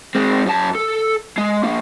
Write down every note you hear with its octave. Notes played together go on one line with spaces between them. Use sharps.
G#3 C4
F#2 A5
A4
G#3
F3 A#3